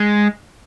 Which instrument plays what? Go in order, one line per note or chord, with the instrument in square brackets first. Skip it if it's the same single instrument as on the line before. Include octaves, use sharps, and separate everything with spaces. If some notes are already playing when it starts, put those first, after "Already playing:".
Already playing: [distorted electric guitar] G#3